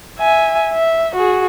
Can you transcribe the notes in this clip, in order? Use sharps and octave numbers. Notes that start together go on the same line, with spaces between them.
E5 G#5
E5
F#4 G#4